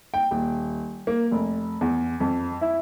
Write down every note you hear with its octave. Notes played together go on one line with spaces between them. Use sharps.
G5
D#1
A#3
F1
E2
F2
E4